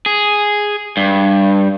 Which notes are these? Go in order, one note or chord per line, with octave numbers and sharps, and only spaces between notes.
G#4
G2